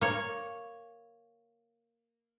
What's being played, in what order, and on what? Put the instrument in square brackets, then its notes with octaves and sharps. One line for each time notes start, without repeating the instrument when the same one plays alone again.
[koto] A#3 C#5